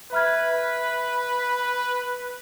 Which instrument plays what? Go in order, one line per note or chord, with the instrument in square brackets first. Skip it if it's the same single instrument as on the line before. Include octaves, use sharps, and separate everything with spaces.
[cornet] B4 [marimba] E5 F6 G#6 [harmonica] B5